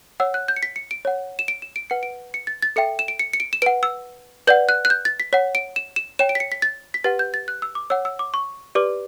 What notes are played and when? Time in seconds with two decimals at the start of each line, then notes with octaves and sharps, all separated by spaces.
0.20 C#5 F#5 E6
0.34 F#6
0.48 G6
0.56 C#7
0.63 B6
0.76 C#7
0.91 D7
1.05 C#5 F#5
1.39 E7
1.48 D7
1.62 E7
1.76 D7
1.90 B4 F#5 C#7
2.03 D7
2.34 C#7
2.47 A6
2.62 A6
2.76 A4 E5 G5 C#7
2.99 E7
3.08 D7
3.19 C#7
3.33 C#7
3.40 D7
3.53 E7
3.62 B4 F#5 D7
3.83 E6
4.47 B4 D5 F#5 G6
4.69 F#6
4.85 F#6
4.90 G6
5.05 A6
5.20 B6
5.33 C#5 F#5 B6
5.55 D7
5.76 E7
5.96 E7
6.19 C#5 G5 E7
6.29 D7
6.35 B6
6.40 C#7
6.52 B6
6.62 A6
6.94 B6
7.04 G4 B4 F#5 A6
7.19 G6
7.34 A6
7.48 F#6
7.62 E6
7.75 D6
7.90 C#5 F#5 E6
8.05 E6
8.19 D6
8.34 C#6
8.75 G4 B4 D5 D6